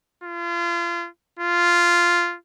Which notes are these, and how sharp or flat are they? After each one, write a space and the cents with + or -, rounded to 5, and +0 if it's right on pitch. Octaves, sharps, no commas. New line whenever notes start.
F4 -30
F4 -5